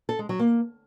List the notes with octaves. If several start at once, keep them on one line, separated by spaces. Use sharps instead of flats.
A4
G#3
F#3
A#3